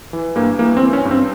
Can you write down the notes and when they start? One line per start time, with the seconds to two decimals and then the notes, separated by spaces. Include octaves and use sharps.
0.13 E3
0.36 G2 A#3
0.59 E3 A#3
0.77 C4
0.81 E3
0.93 C#4
1.05 G2
1.11 C4